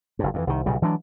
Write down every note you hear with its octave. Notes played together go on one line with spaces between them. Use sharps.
F#1 G2
F2 B2 E3
C2 D#3
B1 A#2 C#3 G3
E3 F#3 G#3 D4